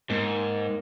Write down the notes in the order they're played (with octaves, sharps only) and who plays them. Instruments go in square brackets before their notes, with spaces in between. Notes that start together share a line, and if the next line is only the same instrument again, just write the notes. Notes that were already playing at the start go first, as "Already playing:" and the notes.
[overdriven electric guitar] G#2 [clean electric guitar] A#3 D#4